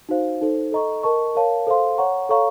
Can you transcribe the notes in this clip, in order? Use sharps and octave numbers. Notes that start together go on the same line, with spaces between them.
D#4 F#4 C5 F5
D#4 A4 C5
A4 D#5 A#5 C#6
A#4 D#5 A5 C#6
A#4 C#5 F5 A5
A4 C5 F5 C6
C#5 F#5 A#5 C#6
A4 C#5 F5 A#5 C#6